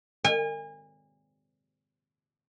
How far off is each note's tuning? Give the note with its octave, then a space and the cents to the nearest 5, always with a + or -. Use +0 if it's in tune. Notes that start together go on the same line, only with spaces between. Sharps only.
G#5 -35